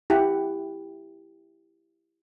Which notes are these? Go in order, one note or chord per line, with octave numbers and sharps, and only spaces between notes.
E4 G4 F#5